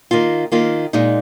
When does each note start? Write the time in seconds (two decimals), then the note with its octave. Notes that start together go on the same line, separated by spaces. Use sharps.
0.11 D#3 A#3 F4
0.52 D#3 A#3 F4
0.93 A#2 G#3 D#4